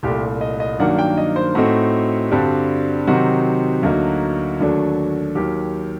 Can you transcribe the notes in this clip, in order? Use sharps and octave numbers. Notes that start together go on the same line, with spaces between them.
C2 A#2 A3 G4
D#5
D#5
G2 D#3 F#3 A#3 D4 F#5
G5
D#5
C5
A2 A3 C4 D#4 F#4
G2 D3 G3 C4
C3 D#3 F#3 C4 D#4 F#4
D2 D3 F#3 A#3 D#4
D#2 D3 F#3 A3 D4
D#2 D#3 F#3 G4